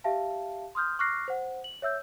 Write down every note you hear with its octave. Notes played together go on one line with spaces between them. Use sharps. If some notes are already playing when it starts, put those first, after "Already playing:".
G4 E5 F5 A5
C6 D#6 F6 G6
C#6 D6 F6 F#6 A#6 C7
C5 F#5
F#7
C#5 E5 E6 G6